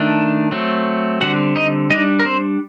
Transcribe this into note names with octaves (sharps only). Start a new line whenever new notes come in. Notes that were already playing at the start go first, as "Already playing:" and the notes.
Already playing: D#3 A3 D4
F#3 A3 C4
D3 G3 C4 F#4 F#5
D#4 D#5
G3 D4 D#4 D#5
A#4
C4 C5